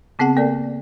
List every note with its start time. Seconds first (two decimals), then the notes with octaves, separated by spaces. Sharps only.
0.19 C#3 B3 C4 G#4 F#5 A5
0.37 A#3 A4 A#4 D5